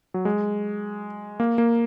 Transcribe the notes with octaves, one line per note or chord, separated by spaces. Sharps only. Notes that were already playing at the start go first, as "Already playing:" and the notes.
F#3
G#3
A#3
A#3